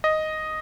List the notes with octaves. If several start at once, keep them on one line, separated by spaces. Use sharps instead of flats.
D#5